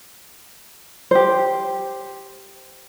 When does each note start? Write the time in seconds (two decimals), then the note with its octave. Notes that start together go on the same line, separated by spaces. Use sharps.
1.11 G4 C5